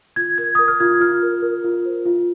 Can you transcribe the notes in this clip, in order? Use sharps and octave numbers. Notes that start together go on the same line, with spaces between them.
F4 G#6
A#4 G#6
A#4 D#6
F6
F4 G#6
F4 F6
A#4
A#4
F4
C5
F4